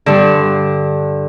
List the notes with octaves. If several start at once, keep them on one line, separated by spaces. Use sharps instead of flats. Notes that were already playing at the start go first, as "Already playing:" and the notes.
G2 D3